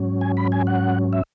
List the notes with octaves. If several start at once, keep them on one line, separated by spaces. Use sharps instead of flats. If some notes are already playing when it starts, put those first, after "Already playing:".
Already playing: G#2 F#3 C#4
G#5
B5
G#5
F#5
E5